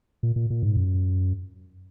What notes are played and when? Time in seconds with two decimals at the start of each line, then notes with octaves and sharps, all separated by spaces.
0.23 A#2
0.36 A#2
0.50 A#2
0.63 G#2
0.77 F#2